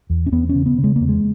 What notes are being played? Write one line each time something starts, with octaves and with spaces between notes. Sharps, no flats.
E2
C#4
E2 B3
C#4
C#3
B3
C#3
G#3
E2 A#3
G#3